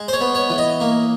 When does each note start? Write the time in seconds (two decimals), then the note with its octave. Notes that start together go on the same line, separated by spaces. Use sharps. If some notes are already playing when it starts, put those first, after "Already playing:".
Already playing: G#3
0.08 C5
0.13 C#5
0.21 B3
0.35 C#5
0.50 E3
0.58 D#5
0.81 A#3